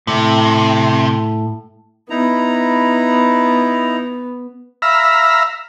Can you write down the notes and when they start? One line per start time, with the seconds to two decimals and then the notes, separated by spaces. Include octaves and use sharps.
0.07 A2 C3
2.10 B3 D#4 E4 A#5
4.82 E5 F5 A#5 B5